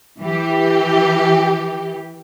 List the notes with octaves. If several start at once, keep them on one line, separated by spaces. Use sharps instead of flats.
E3 G4